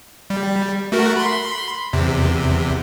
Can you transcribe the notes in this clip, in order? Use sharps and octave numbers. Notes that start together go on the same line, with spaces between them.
G3
A3 F#4 A#4
B5 C6
E2 C3